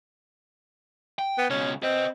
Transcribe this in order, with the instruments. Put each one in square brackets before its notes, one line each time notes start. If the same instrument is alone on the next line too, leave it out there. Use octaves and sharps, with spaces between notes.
[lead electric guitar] G5
[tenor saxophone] B3
[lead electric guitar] C#2 B2 [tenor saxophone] C#4
[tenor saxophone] C4 [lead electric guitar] B4 D#5